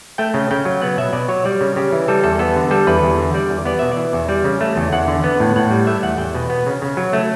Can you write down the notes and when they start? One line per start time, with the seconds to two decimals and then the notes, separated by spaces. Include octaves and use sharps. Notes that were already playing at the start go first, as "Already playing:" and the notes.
0.18 A3 G5
0.34 C#3
0.51 C#3 G5
0.65 F#3
0.82 B3 F#5
0.97 B2 E5
1.13 B2 D5
1.29 F#3 C#5
1.45 G3 D5
1.61 C#3
1.76 C#3 G4
1.92 E3
2.08 G3 A4
2.24 E2 A4
2.39 B3 A4
2.56 D3
2.71 G3 A4
2.87 E2 B4
3.03 E2
3.18 D3
3.34 G3 D5
3.50 E2
3.65 B3 D5
3.79 B2 E5
3.92 D5
3.97 E3
4.13 E2
4.29 G3 D5
4.45 C#3
4.61 A3
4.77 E2
4.92 E2 F#5
5.08 D3
5.24 B3
5.40 A2
5.56 A2 F#5
5.71 G3
5.87 A3 E5
6.03 E2 F#5
6.18 E2 G5
6.35 B2
6.50 B3
6.66 C#3
6.82 C#3
6.97 F#3
7.13 A3